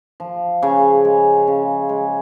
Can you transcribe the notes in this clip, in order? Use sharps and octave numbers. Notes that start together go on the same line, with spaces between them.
F3
C#3
G#3
C#3
G#3